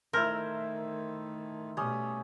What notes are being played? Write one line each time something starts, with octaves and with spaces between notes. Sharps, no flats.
D#3 A3 E4 A4 A#4 C5
B2 G3 A3 C#4 D#6